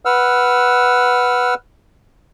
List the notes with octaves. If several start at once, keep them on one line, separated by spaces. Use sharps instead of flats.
B4 F#5 E6 F6